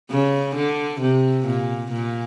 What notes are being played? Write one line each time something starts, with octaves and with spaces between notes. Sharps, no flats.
C#3
D3
C3
A#2
A#2